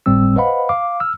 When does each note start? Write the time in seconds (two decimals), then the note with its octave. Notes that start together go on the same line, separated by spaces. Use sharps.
0.06 G1 A2 G3 C4 E6
0.36 B4 C5 D#5 F5 F#5 B5
0.69 F5 D6
1.00 E6 F6